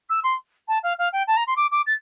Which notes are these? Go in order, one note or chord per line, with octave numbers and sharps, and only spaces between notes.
E6
C6
A5
F5
F5
G5
A5
A#5
C6
D6
D6
A6